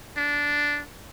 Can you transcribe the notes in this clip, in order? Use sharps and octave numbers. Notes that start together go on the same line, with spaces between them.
D4